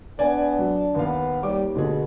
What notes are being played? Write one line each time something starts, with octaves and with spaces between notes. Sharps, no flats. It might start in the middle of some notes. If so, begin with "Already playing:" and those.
B3 D4 D5 G#5
F#3
D#2 B3 F5
D#2 G3 D6
D2 B2 D3 G#4